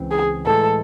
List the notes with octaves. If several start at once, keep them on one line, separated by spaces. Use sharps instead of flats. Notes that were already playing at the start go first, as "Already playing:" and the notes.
Already playing: C#2 C#3 E3 C4
G#4
A2 E3 G#3 A4